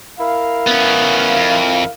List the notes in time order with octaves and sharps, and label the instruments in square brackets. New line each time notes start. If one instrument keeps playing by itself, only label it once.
[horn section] E4 A#4 F5
[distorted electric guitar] B3 C#4
F2